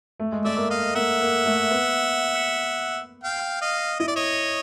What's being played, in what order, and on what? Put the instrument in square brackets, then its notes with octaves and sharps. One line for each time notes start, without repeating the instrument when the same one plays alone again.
[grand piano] A3
G#3
[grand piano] A3 [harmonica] D5 E5
[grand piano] A#3
[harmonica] D#5 F5
[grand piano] A#3 [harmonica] E5 F#5
[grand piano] A#3
A3
B3
[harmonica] F5 G5
D#5 F5
[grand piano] E4 [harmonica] D#5
[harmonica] D5
C#5 D#5